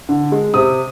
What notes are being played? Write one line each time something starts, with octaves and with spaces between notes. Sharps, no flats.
D3
G#3
C3 D#6